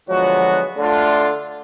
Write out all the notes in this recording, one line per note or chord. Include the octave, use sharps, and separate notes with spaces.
D3 F3 F#3 G#3 B3 F#4
D3 A3 D4 F4